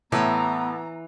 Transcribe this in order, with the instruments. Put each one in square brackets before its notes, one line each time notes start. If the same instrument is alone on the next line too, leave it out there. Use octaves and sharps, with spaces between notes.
[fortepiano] A2 [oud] E3 [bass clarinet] B3 [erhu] A#5